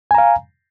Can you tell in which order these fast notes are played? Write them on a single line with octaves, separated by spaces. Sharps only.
G#5 A#5 F5